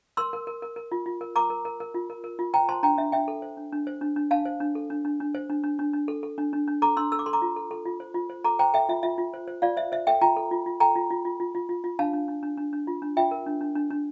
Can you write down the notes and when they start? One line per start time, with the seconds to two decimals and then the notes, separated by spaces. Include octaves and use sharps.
0.17 A#4 C6 E6
0.33 A#4
0.47 A#4
0.62 A#4
0.76 A#4
0.92 F4
1.06 F4
1.21 A#4
1.36 A#4 A#5 D6
1.50 A#4
1.65 A#4
1.80 A#4
1.94 F4
2.10 A#4
2.24 A#4
2.39 F4
2.54 C5 G5 A#5
2.69 C5 A5 C6
2.83 D4 G5 A#5
2.98 D4 E5
3.12 D4 E5 G5
3.28 A4
3.42 C5
3.57 D4
3.72 D4
3.87 C5
4.01 D4
4.16 D4
4.31 D4 F5 A5
4.45 C5
4.60 D4
4.75 A4
4.90 D4
5.05 D4
5.20 D4
5.35 C5
5.50 D4
5.63 D4
5.79 D4
5.93 D4
6.08 A4
6.23 A4
6.38 D4
6.53 D4
6.67 D4
6.82 A4 A#5 D6
6.97 D4 C6 E6
7.12 A4 E6
7.19 D6
7.26 A4 C6
7.33 A#5 D6
7.42 F4
7.56 A4
7.71 A4
7.86 F4
8.00 C5
8.14 F4
8.30 C5
8.44 A4 A#5 D6
8.59 C5 G5 A#5
8.74 A4 E5 G5
8.89 F4 E5
9.03 F4 E5
9.18 F4
9.34 C5
9.48 C5
9.62 F4 D5 F5
9.77 C5 E5
9.92 C5 E5
10.07 A4 E5 G5
10.21 F4 G5 A#5
10.37 A4
10.51 F4
10.66 F4
10.80 A4 G5 A#5
10.96 F4
11.10 F4
11.25 F4
11.40 F4
11.55 F4
11.69 F4
11.84 F4
11.99 D4 F5 A5
12.13 D4
12.28 D4
12.43 D4
12.58 D4
12.73 D4
12.87 F4
13.02 D4
13.17 F4 E5 G5
13.31 A#4
13.46 D4
13.61 D4
13.75 D4
13.90 D4